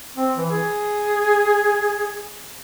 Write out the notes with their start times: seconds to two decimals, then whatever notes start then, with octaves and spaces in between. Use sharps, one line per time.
0.16 C4
0.37 E3
0.51 G#4